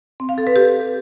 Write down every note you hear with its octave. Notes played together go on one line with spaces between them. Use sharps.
C4
F5
A4
B4
G4